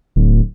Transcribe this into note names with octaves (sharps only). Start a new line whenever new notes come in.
D1